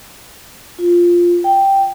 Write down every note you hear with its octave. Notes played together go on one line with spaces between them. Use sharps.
F4
G5